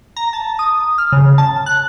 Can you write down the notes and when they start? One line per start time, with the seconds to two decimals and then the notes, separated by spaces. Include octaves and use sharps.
0.16 A#5
0.33 A5
0.59 D#6
0.98 F6
1.12 C#3
1.38 A5
1.66 F#6